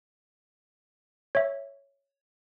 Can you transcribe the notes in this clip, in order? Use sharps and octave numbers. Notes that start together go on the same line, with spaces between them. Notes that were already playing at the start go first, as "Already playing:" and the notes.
C#5 E5